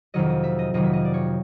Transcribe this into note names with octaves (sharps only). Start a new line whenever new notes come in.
F2 C3 D#3 F#3 D#5
D#5
E5
D#5
F2 C3 D#3 F#3 D#5
E5
D#5
D5
C#5